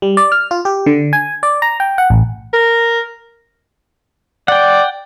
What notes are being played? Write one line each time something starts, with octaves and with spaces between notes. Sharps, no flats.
G3
D5
F6
F4
G4
D3
G#5
D5
A#5
G5
F#5
A1
A#4
D5 F#5 G5